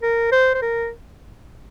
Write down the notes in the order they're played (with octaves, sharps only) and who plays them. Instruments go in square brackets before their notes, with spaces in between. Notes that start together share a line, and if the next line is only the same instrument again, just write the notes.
[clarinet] A#4
C5
C5
A#4